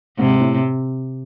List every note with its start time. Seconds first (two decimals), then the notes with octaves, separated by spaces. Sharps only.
0.19 G#2 C3
0.41 A2